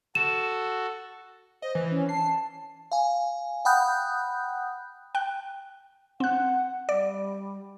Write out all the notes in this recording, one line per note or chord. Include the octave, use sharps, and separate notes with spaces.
F#4 A4 E7
C5 D#5
E3
C#4
A5 C7
F5 G#5
F#5 G5 B5 D#6 F#6 G6
G5 F#6
C4 F#5 F#6
G3 D5